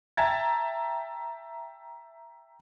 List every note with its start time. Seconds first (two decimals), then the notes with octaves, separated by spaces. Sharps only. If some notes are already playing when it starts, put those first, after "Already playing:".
0.17 E5 G5 A5 A#5 G#6 A6